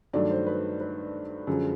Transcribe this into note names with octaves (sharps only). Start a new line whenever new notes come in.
G2 D#3 F#3 A3 D4 D5
C5
B4
B4
F#2 D3 F3 G#3